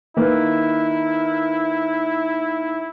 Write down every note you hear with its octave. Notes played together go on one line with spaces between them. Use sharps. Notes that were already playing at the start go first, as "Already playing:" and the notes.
D#3 A#3 E4 B4